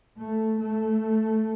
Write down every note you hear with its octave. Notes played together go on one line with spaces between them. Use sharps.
A3
A3